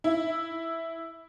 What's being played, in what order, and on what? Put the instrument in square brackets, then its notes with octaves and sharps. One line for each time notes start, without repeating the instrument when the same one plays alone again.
[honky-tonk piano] E4